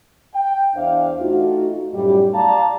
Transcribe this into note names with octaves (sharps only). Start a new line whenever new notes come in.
G5
E2 D4 C5 E5 F5
A3 D#4 F4 F#4
F#2 A2 G3
D5 F5 A5 A#5